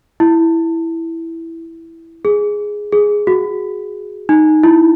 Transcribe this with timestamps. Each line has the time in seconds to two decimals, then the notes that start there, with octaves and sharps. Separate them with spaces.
0.20 E4
2.25 G#4
2.92 G#4
3.27 F#4
4.29 D#4
4.63 E4